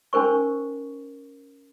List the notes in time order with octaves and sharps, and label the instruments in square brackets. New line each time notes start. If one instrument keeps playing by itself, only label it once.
[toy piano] C#4 D#4 A#4 C5 C#6